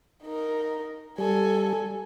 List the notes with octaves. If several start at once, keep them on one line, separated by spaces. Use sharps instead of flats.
D#4 A#4
G3 A4 G#5